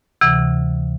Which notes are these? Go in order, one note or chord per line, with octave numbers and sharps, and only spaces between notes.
D2 C3 E3